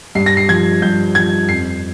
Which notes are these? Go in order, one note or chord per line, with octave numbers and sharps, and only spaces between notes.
G2 C7
A#6
C7
F3 G#6
G2 G6
F3 G#6
F2 C7